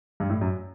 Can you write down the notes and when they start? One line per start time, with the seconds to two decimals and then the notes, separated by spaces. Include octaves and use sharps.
0.20 G2
0.30 A2
0.41 F#2